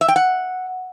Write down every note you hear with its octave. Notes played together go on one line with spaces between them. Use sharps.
E5
G5
F#5